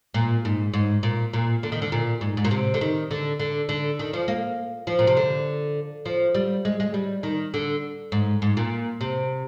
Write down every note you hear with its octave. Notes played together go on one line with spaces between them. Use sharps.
A#2
G#2
G#2
A#2
A#2
D3
D#3
D3
A#2
G#2
G#2
A#2
C3
D3
D#3
D3
D3
D3
D#3
F3
A#3
F3
A#2
C3
D3
F3
G3
G#3
G#3
G3
D#3
D3
G#2
G#2
A#2
C3